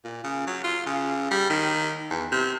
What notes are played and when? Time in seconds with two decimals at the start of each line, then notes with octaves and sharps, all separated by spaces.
0.04 A#2
0.24 C#3
0.47 F#3
0.64 F4
0.86 C#3
1.31 G3
1.50 D#3
2.10 E2
2.32 C3